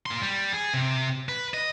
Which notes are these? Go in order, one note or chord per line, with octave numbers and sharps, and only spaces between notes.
A#3 C6
G3
G#4
C3
B4
D#5